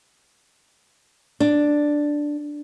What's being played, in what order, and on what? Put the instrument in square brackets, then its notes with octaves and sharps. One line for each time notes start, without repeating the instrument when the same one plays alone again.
[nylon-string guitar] D4